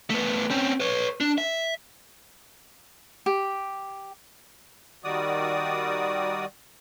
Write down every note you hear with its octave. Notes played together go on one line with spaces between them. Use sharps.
A3 B3
C4 C#4
B4 C#5
D4
E5
G4
D#3 G3 F#4 D5 D#6